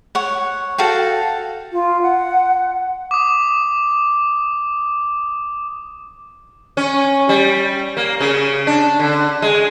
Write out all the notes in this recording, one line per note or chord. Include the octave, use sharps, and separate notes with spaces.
C#5 F#5
F#4 A4 F5 G5
F4
F#5
D6 D#6
C#4
G3
A#3
C#3
D4
D3
G#3